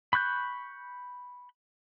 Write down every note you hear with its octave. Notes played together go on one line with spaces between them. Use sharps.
B5 C#6 F#6 G6